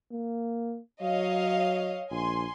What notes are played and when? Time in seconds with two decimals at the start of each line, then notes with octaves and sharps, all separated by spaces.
0.12 A#3
1.02 F#3 C#5 D#5 F5
2.11 A#1 G#5 C6